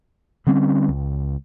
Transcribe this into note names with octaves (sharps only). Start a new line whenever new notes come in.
D3 G3 C4 C#4
C#2